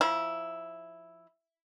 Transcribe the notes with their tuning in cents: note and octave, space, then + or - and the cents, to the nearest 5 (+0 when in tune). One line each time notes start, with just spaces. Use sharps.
F3 +0 E4 +0 B5 -40